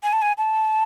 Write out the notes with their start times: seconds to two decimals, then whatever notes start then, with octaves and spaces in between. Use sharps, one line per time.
0.03 G#5
0.13 A5
0.22 G#5
0.38 A5